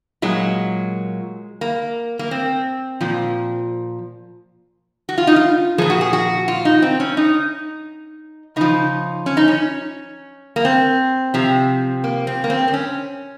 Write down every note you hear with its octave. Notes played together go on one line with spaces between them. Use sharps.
A#2 F#3 G#3
A#3
A#3
C4
A#2 F3
F#4
F4
D#4
F4
A#2 F3 G#4
F#4
G#4
F#4
F4
D#4
C4
C#4
D#4
C#3 F3 D#4
C#4
D#4
C#4
A#3
C4
C3 F3
A#3
C4
A#3
C4
C4
C#4